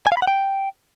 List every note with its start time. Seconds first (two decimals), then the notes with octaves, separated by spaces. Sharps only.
0.07 G#5
0.12 F5
0.17 B5
0.22 F#5
0.27 G5